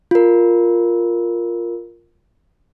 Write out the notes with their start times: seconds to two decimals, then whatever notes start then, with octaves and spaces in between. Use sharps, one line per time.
0.11 F4 A#4